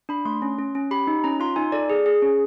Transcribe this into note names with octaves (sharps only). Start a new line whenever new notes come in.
D4 B5
A3 C6
C#4
C#4
C#4
G4 B5
D#4
C#4 A#5
F4 C6
D#4 G#5
A4 D5
G#4
G#4
C#4